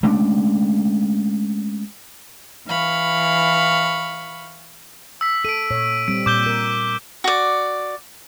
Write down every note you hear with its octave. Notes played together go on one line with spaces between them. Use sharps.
G#3 A3 C#4 D4
E3 F5 B5 C#6
E6 B6
A4 D7 D#7
A#2 C#5
G3 C4 D7
A#2 D6 G6 G7
A#4
F#4 D5